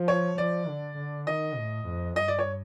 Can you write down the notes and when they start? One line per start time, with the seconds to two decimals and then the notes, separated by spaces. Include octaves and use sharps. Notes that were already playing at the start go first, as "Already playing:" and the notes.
Already playing: F3
0.08 C#5
0.38 F3 D5
0.68 D3
0.98 D3
1.27 D#3 D#5
1.57 A2
1.86 F2
2.16 G2 D#5
2.28 D5
2.39 C#5